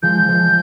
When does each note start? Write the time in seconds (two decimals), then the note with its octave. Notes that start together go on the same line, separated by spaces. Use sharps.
0.03 F3 G#3 G6
0.28 F3 G#3